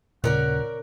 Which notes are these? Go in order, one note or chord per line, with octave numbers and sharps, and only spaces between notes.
D#1 A#2 C#3 C#4 A#4 D5 F#5